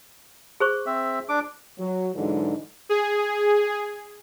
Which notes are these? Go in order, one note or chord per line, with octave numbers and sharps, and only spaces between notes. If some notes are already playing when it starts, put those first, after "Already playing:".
G#4 C5 C#6
C4 E5
D4 D6
F#3
G#2 D3 E3 F#3 G#3 D#4
G#4